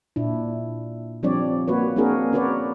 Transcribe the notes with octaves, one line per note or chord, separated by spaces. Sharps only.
A#2 D4 E4
F3 G3 C4 D4 C#5 D5
A#3 F#4 B4 C#5
A#3 C4 D4 F#4 G#4 A#4
C#4 F#4 A#4 B4 C#5 D5